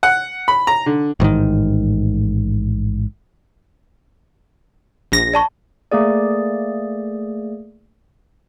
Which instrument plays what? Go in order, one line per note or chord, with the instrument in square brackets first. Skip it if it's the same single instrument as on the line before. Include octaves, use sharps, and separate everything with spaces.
[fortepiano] F#5
B5
A#5
D3
[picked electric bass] A1 G#2 C3 D#3
[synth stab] A#1 A#6
[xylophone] D5 A5 C#6
[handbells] A3 A#3 G#4 D5